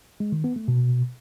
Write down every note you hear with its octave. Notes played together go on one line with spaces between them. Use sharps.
G#3
D#3
B3
A3
B2